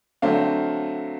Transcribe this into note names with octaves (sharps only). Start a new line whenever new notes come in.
D3 F#3 A3 C4 F5